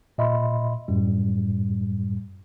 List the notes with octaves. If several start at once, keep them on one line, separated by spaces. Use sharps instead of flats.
A#2 D#5 E5 B5 C6
F#2 A2 G3